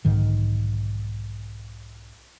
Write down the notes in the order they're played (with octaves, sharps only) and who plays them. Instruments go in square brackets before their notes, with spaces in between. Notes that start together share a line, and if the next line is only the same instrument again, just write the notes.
[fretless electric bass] B1 G#2 D3 D#3